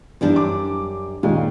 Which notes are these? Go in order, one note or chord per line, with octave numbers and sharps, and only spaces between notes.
F#2 E3 G3 D4
D6
D#2 A#2 G#3